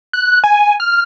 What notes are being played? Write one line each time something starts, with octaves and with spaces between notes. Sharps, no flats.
F#6
G#5
F6